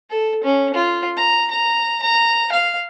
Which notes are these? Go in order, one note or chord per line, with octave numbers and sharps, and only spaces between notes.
A4
C#4
F4
A#5
A#5
A#5
F5